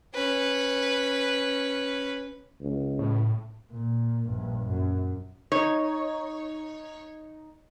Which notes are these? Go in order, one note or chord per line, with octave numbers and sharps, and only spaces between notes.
C#4 B4
C#2
A2
A#2
A#1 G2
F#2
D#4 C#5